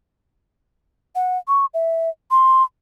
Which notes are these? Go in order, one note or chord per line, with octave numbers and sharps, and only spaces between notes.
F#5
C#6
E5
C6